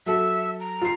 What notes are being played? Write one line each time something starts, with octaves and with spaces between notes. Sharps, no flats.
F#3 A4 E5
A#5
F4 C7